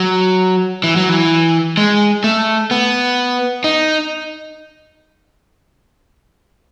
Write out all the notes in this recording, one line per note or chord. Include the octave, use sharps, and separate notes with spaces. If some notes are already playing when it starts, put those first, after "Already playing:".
Already playing: F#3
E3
F#3
E3
G#3
A3
B3
D#4